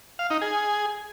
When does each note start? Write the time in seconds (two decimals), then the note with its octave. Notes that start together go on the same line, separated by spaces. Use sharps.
0.19 F5
0.30 D#4
0.42 G#4